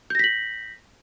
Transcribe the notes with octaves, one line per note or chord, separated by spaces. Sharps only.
G6 A#6 B6 F#7